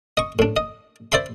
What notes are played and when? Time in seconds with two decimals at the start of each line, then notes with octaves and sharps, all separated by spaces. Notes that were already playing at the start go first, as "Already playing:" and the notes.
0.17 D#5 C#6
0.39 A2 D4
0.56 D#5
1.12 C5 D5 E5 B5 C6